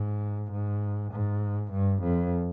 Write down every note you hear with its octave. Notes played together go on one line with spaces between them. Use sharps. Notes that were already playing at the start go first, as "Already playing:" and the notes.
Already playing: G#2
G#2
G#2
G2
F2